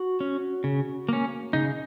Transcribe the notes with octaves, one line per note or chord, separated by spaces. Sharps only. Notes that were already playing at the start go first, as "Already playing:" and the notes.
Already playing: F#4
C#4
C#3
A#3 C#4
C#3 D#4